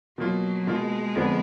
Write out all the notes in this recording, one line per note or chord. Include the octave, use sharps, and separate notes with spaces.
B2 F#3 A#3 F4
B2 G#3 A#3 F4
F2 D3 F3 B3